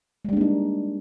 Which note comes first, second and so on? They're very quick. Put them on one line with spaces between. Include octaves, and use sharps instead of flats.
G#3 G3 D4 A#3 D#4